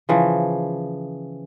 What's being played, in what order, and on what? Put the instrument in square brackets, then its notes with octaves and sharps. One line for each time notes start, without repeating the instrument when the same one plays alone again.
[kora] C#3 E3 F3